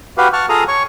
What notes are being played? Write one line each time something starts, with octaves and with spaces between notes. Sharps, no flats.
F#4 G4 B4 F5
F#5 A5 C#6 F6
F4 G#4 A4 F5 A#5 D#6
C#5 C#6